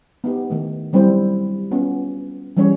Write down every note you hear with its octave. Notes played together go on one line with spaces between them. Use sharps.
B3 D#4 G4
D#3 A3
F#3 G3 C4 E4 C5
B3 C#4 F4
E3 F#3 G3 C#4 C#5